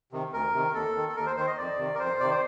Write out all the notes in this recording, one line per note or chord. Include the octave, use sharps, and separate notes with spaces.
C3 D#3
D2 A#4
C3 D#3
D#2 A4
D#3
A4
D#2 A#4
C5
D#3 C5
D#5
F2 D5
C3 D#3
A#4
F2 C5
C3 D#3 D5
C5